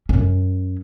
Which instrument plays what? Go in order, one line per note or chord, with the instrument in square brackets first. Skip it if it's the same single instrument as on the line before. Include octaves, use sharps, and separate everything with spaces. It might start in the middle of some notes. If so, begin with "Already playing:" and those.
[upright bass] F#2 C#4